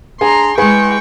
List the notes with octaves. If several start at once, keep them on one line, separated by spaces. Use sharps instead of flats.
D4 G#4 A#5 C6
G#3 E4 G#4 B4 G5 C#6